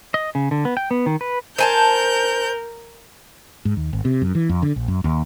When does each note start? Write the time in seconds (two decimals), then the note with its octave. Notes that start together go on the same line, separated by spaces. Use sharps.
0.14 D#5
0.35 C#3
0.51 D3
0.65 B3
0.77 G5
0.91 B3
1.06 D#3
1.21 B4
1.58 A#4 C5 G#5 A5 G6
3.65 G#2
3.77 D#2
3.93 G#1
4.05 C3
4.22 F#2
4.35 E3
4.49 F2
4.62 D3
4.76 A#1
4.88 F#2
5.04 D#2